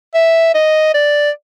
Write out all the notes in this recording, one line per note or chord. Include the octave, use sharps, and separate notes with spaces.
E5
D#5
D5